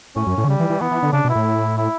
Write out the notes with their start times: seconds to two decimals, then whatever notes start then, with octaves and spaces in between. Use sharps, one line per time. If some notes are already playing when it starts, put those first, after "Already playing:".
0.16 A2 C#4
0.27 F#2
0.38 A2
0.44 D3
0.48 C#3 G3
0.60 E3
0.70 E3
0.81 E3 B3
0.91 E3
1.03 D3
1.13 C#3 D4
1.25 B2
1.29 E4
1.35 A2
1.78 E4